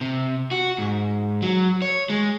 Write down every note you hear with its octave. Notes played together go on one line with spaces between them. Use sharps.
C3
F#4
G#2
F#3
C#5
G#3